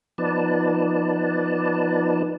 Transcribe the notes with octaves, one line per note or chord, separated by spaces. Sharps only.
F3 B3 D#4 B4 D5 A5